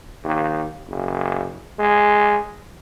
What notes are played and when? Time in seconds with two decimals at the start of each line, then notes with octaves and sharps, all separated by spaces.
0.24 D#2
0.88 F#1
1.79 G#3